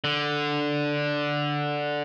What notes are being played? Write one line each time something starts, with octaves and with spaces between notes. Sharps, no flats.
D3